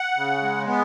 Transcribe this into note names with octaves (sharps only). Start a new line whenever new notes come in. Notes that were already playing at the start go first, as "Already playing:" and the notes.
Already playing: F#5
C#3
G#3
B3